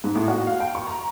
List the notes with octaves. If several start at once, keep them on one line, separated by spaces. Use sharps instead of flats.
G#2
A2
F#4
F5
G5
C#6
A#5